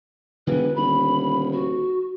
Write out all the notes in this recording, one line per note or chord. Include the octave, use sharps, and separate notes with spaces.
E1 D3 E3 B3 B4
D#1 B5
F#4